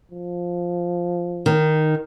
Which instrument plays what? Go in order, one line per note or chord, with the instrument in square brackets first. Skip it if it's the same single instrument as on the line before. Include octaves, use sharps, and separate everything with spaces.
[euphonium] F3
[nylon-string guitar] D#3